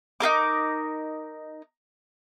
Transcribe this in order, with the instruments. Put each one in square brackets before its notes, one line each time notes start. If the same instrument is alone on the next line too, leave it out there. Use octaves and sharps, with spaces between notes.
[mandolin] D#4 F4 A#4 D6